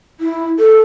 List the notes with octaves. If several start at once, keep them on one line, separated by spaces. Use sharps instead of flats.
E4
A4